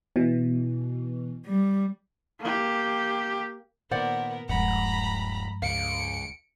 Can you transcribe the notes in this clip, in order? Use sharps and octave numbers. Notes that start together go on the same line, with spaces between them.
B2 E3
G3
A#3 G4
A#2 D#3 B3 A#4 C5 D5 F#5
D#1 G2 F3 G#3 F#5 A#5 B5
C#2 F5 C#7 D7